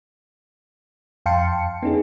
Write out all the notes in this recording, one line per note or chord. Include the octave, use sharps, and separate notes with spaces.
F2 F5 G5 A5 C6 C#7
B3 C#4 D#4 G#4